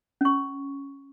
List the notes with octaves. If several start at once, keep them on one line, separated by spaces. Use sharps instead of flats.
C#4 C#6